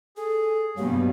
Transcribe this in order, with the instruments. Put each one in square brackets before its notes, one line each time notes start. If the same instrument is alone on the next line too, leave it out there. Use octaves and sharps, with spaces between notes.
[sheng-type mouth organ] G#4 [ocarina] A4
[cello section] G2 B2 [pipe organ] F#3 A#3 [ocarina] G4